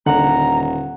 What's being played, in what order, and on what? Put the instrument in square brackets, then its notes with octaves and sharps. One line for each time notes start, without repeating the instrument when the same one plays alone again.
[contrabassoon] D#1 [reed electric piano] D3 [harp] F#5 [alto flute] A#5